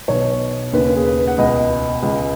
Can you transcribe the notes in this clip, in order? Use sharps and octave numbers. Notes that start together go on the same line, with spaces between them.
B1 B2 C#5
D#2 C#3 B4
G#4
B4
F#5
C#2 B2 D#5
C#2 C#3